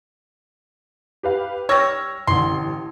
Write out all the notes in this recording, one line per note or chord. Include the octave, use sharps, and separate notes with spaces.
G4 B4 F5
G3 C#5 E6 F6 A#6
A1 D3 C6